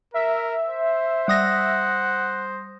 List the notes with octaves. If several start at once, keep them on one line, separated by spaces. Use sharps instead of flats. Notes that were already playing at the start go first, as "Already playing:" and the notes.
A#4 E5
C5
G3 F#5 D#6 A#6